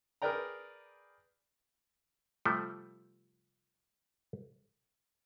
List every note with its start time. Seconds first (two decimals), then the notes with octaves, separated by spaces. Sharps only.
0.22 G#4 A#4 B4 D5 G5 A#5
2.45 C3 F3 G3 A3